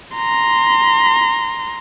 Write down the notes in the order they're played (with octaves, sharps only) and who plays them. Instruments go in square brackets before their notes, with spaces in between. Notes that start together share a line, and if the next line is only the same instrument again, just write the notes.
[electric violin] A#5 C6